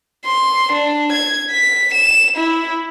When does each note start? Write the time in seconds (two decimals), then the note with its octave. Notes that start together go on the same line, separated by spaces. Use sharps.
0.25 C6
0.72 D4
1.13 G#6
1.51 B6
1.94 E7
2.36 E4